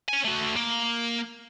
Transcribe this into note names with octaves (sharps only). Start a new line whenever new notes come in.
C#5 G#5
A3 F#4
A#3